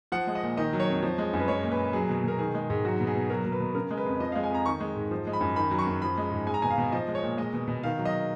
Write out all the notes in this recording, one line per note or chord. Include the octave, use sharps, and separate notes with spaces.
F3 F#5
G#3
D#5
A#2
D#3 D#5
F#3
C#5
F2
F3
G#3
F#2
B4
G#3 C#5
A#2
B4
A#2
F#3 G#4
B2
B2 A#4
D#3 G#4
G#3
G#2
F#3 F#4
B2
G#4
B2
F#3 A#4
B2
B4
B2
C#3 A#4
G#3
B4
F2
F3 D#5
G#3 F5
G#5
F2 A#5
D#3 C#6
G#3
G#2
F3
G#3
B5
F#2
D#3 B5
F#3
C#6
F#2
F3 B5
G#3
G#2
G#3 G#5
A#5
B2 G#5
F5
B2
F3 D#5
G#3
C#5
A#2
G#3 D#5
B2
B2
D#3 F5
F#3
D#5